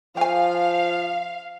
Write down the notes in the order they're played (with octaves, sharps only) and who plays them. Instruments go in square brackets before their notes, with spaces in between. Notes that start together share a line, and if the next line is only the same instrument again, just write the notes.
[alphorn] F3 [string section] F5 [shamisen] G5 G#5